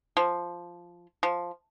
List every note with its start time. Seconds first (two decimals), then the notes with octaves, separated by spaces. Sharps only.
0.17 F3
1.23 F3